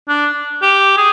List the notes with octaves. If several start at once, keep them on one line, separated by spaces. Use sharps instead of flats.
D4
G4
G#4